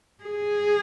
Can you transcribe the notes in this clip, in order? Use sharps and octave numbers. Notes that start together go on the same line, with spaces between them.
G#4